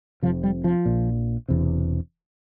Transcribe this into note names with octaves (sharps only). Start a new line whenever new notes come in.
F1 F2 C3 F3
G3
F3
A#1 A#2
E1 E2 C3